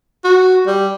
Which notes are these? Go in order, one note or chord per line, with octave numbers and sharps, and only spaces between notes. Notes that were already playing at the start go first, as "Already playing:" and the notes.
F#4
G3